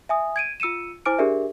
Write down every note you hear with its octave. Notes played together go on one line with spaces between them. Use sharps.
E5 G#5 D#6
G#6 D7 D#7
F4 E6 C#7 D#7 E7
E4 C5 G#5 D6 F6 D7
D4 G4 G#4 A#4 D5 E5